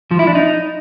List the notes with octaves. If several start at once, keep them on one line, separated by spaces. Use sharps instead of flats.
F3
E4
D4
D#4